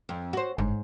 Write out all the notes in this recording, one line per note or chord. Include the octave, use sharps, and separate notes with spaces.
F2
F#4 C5
G1 G#2